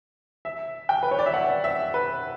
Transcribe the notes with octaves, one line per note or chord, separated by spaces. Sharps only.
E5
G5
B4
C#5
D5
E5
F#5
E5
B4